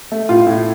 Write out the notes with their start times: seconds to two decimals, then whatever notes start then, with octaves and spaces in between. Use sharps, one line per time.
0.12 A3
0.29 A2 F4
0.47 A2